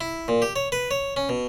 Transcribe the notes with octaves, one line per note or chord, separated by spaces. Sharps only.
E4
A#2
G4
C#5
B4
C#5
C#4
B2